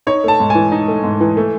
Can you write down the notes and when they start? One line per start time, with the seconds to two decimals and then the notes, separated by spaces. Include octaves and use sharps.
0.07 D#4 C#5
0.24 A3 A5
0.40 G#2
0.50 E3 G#5
0.72 D#4
0.88 A3
1.04 G#2
1.20 E3
1.37 A3